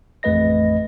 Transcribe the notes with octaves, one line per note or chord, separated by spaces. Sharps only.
A1 F2 A3 B4 D#5 A#6